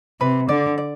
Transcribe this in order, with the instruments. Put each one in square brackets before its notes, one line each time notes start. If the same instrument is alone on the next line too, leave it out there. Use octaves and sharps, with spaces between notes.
[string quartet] C3 [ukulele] B4
[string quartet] D3 [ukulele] D5
[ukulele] D5